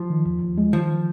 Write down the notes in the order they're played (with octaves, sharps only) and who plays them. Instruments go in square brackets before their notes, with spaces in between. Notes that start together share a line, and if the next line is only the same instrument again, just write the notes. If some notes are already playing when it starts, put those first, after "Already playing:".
Already playing: [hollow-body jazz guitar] F3
[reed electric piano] D#3
D#2
D#2
G#3
[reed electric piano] D#3 [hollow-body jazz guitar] F3